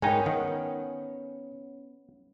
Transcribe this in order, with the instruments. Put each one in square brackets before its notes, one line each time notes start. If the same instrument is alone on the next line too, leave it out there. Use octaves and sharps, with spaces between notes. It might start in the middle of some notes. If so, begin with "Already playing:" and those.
[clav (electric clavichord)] G#2 G#3 D#4 [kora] B3 C#4 [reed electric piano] A#4 G5 G#5
[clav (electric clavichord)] D#3 [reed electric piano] F#5